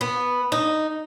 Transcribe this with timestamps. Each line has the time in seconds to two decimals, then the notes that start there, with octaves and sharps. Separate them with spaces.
0.01 B3
0.52 D#4